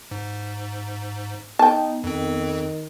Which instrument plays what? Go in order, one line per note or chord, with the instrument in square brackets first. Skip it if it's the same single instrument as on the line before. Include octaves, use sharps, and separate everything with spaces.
[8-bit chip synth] G#2
[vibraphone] B3 [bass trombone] D#4 [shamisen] G5 A5
[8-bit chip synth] F2 C4 [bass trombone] D#3